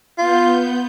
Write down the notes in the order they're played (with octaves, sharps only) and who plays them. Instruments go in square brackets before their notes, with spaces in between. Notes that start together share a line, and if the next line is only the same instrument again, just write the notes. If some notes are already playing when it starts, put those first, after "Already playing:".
[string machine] B3 G6 [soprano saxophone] F4